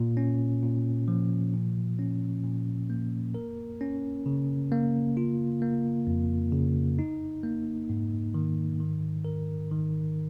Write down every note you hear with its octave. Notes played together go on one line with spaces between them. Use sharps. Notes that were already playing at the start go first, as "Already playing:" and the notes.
Already playing: A#2
C#4
A#2
F3
A#2
C#4
A#2
A#3
A#4
C#4
C#3
A#3
F4
A#3
F2
C#3
D#4
A#3
G#2
D#3
D#3
A#4
D#3